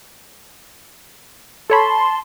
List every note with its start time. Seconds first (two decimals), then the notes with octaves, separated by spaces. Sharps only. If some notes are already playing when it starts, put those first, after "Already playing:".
1.70 A4 C#5 A5 B5 C6